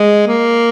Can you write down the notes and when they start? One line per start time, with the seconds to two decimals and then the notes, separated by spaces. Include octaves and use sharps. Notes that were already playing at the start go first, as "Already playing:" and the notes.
Already playing: G#3
0.27 A#3